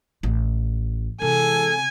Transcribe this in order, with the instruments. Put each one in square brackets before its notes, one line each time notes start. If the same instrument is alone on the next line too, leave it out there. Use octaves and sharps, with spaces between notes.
[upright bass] A1
[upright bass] C3 [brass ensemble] E3 G#3 A4 [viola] G#5